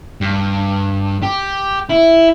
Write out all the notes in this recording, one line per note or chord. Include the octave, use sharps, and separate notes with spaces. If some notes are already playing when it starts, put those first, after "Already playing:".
G2
G4
E4